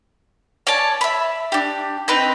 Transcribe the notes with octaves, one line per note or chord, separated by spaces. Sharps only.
C#5 D5 G#5 A5
E5 B5
D4 G4
C4 D#4 B4 G5